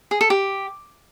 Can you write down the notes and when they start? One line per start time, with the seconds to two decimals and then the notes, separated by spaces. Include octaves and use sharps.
0.11 G#4
0.21 A4
0.30 G4